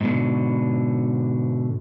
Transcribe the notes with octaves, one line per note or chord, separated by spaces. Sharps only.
G#2 B2 D3